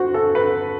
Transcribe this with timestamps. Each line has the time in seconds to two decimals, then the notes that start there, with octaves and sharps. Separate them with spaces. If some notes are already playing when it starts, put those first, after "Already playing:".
Already playing: F#4 C5
0.14 A4
0.35 B4